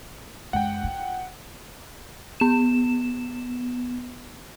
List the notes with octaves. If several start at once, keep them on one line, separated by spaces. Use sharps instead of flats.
F#2 G#3 F#5 G5
F4
B3 E7